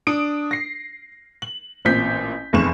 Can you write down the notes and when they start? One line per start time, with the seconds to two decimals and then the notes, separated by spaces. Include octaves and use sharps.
0.07 D4 D#6 D7
0.51 A#6 C7
1.42 F#7
1.85 A1 A#2 C4 G6 B6
2.53 F1 E2 C#6 E7